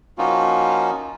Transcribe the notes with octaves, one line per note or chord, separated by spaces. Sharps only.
F3 A#3 C#4 D#4 F4 F#4